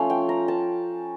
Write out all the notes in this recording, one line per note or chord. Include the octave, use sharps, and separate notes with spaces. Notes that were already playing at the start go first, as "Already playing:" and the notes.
Already playing: F3 A3 C#4 F4 F5
G5
A#5
A5